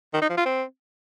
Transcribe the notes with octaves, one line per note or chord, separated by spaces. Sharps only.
D#3
D#4
F3
F4
C4